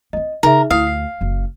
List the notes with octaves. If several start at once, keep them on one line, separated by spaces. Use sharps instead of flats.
B3 C4 D#5
C#3 D#4 G#4 A#4 E5
D2 E4 F5 D#6
C7
F#1 F#2